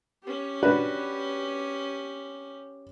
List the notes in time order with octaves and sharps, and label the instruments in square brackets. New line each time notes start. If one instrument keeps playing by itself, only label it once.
[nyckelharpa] C#4 G4
[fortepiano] D4 F#4 B4